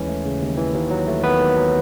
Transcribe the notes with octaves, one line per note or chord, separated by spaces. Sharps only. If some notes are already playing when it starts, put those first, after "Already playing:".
Already playing: D#2 E3 G#3 C#4
A3
C#3
D#2
E3
D#2
F#3
A3
D#3 B3 B4
D#2
F#3